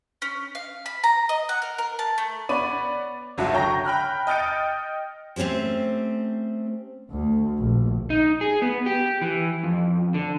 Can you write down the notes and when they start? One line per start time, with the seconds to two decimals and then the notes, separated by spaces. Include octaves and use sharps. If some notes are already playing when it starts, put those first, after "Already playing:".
0.22 C#4
0.55 F5
0.86 B5
1.04 A#5
1.29 D#5
1.49 F#5
1.62 A#4
1.78 A#4
1.99 A5
2.18 A3
2.49 B3 C#5 D5 B5 D#7
3.38 G1 C#2 F#3 F#4 E5 A5
3.54 C#5 G5 A#5 C#6 A#6
3.85 G5 B5 F6 F#6
4.27 D#5 G5 F6 A6 C#7 D7
5.36 A3 C4 C#4 G4 C5
7.11 D2
7.58 A#1
8.10 D#4
8.41 G#4
8.62 B3
8.86 G4
9.22 E3
9.64 F2
10.14 D3